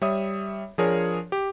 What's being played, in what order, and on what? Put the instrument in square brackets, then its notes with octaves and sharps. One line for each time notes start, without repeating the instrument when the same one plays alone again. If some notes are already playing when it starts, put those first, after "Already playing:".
[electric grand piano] G3 C#5 E5 D#6
F3 D4 G#4 A#4 C#5
G4